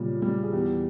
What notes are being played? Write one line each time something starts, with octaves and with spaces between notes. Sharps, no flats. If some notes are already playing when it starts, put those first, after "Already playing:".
Already playing: A#2 C#3 G3
G3
G#4
E2 G4